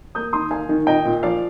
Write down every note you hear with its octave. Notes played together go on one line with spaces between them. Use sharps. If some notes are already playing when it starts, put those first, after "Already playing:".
A#3 D#6 G6
D#3 C6 D#6
A#3 F5 G#5
D#3
A#2 D#5 G5
A#2
F3 D5 F5